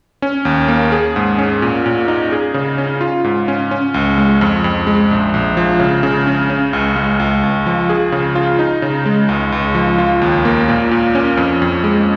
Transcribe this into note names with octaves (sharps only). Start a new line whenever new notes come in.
C#4
D#2
A#3
G#4
G#2
C#4
A#2
A#2
D#4
G#4
C#3
C#4
F4
G#2
C#4
C#4
C#2
G#3
F2
F2
G#3
A#1
A#1
F3
C#3
C#3
C#4
C#4
C#2
G#3
C#2
C#2
F3
G#4
C#3
F4
D#4
C#3
G#3
C#2
C#2
F3
F4
D#2
A#3
A#2
A#2
C#4
F2
F2
G#3